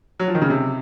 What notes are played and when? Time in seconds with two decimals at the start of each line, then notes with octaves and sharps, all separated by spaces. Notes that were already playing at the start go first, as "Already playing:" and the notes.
0.20 F#3
0.28 F3
0.35 D#3
0.42 C#3
0.50 C3